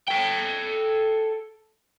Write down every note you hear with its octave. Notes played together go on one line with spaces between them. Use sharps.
A4 G5